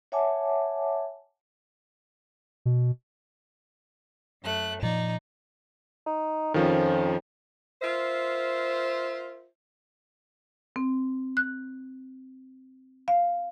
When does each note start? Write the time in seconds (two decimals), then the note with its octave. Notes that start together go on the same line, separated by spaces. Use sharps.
0.12 C#5 E5 F#5 G#5 A5 D6
2.66 B2
4.43 F#2 A3 F#6
4.83 A#2 F3 D#4 D5
6.06 D#4
6.54 F2 D#3 F3 C#4
7.81 F4 A#4 C5 E5
10.76 C4
11.37 F#6
13.08 F5